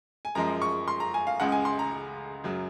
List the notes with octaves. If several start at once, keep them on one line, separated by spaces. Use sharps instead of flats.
G#5
F#2 F3 G#3 A#5
C#6
C6
A#5
G#5
F5
C#2 C#3 G#3 F#5
G#5
C6
A#5
F#2 C#3 F#3